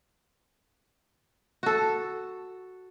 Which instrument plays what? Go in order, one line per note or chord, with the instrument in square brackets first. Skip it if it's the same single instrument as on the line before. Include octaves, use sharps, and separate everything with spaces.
[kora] F#4 A4